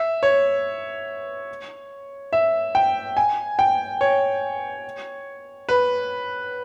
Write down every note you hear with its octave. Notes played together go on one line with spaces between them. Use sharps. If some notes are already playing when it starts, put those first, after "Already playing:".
Already playing: E5
C#5
E5
G5
G#5
G5
C#5
B4